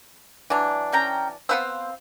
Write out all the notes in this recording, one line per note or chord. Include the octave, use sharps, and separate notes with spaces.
E3 F#3 D4
C#4 G5 A#5
B3 C4 B4 C5 F5 E6